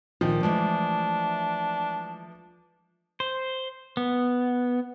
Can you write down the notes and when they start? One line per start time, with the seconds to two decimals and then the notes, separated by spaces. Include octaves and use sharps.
0.21 A#2 D#3 F3
0.43 E3 G#3 A3 D4
3.20 C5
3.97 B3